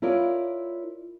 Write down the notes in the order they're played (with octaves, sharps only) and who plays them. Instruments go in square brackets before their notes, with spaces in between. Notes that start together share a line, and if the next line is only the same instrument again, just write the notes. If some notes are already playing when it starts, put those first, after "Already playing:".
[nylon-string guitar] E4 F4 A#4 C#5 D5